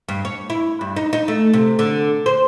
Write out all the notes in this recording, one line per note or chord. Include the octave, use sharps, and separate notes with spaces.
G2
C#5
E4
G2
D#4
D#4
A3
C3
D3
C5